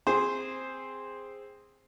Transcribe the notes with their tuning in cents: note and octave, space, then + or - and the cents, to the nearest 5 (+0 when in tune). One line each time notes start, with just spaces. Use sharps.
C4 +0 G#4 -15 C5 +0